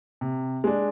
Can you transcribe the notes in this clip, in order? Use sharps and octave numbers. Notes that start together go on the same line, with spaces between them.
C3
G#3 D4